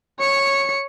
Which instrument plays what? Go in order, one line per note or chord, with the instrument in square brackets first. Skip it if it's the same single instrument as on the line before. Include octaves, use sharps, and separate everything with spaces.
[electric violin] C#5 C#7